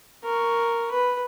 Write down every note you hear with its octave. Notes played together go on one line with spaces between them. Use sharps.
A#4 C#6
B4